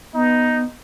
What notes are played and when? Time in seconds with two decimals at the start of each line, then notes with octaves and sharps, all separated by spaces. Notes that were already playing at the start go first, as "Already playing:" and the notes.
0.14 B3 D#4